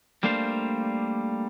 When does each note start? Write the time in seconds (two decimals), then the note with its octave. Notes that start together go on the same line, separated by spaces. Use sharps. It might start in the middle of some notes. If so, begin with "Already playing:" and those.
0.23 G3 A3 A#3 D4 C5 F5